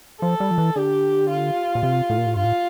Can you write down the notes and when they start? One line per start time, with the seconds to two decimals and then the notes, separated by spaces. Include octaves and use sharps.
0.22 F3 A4
0.40 G3
0.51 F3
0.58 E3
0.76 D3 G4
1.29 F4
1.75 A#2
1.83 C3
2.10 A2
2.18 A#2
2.26 A2
2.36 G2 F4
2.44 A2